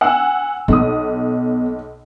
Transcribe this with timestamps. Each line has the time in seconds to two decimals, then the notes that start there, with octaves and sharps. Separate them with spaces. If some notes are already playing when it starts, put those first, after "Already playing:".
0.01 F#5 G#5 E6
0.68 B1 B3 D#6